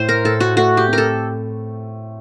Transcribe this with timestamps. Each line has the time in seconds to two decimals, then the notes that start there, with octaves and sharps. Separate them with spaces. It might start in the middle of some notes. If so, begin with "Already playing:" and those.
Already playing: A2 C5
0.09 A#4
0.24 A2 A4
0.40 F#4
0.56 A3 F#4
0.77 G4
0.88 C4
0.93 A4 A#4